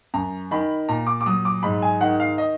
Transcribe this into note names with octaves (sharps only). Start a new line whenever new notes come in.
F#2 A#5
D#3 B5
A#2 A#5
D6
D6
F#3 D#6
D6
G#2 B5
G#5
D#3 F#5
F5
D#5